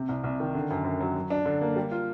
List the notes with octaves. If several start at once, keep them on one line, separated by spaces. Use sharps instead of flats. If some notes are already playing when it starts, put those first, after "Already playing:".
Already playing: C3
C2
C2
D#3
D3
F#2
F#2
F#3
F#3
D4
D3
A#3
G3
F4